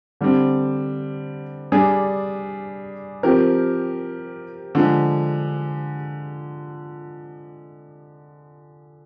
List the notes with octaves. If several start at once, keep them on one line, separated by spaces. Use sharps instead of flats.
D3 G3 C4
G3 D4 G#4
F3 C4 G4 A#4
D3 F3 G#3